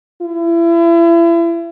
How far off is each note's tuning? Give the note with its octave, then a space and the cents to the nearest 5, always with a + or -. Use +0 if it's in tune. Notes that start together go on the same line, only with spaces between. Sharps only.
E4 +35